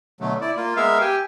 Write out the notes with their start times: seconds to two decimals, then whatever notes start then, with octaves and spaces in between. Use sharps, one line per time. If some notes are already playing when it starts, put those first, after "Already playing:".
0.20 B2 D3 F#3 A3
0.41 E4 D5
0.57 A#3 F4
0.77 G#3 B3 A#4 E5 F5
1.01 G4 G5 G#5